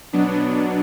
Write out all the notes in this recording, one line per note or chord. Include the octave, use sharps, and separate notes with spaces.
B2 F#3 B3 D4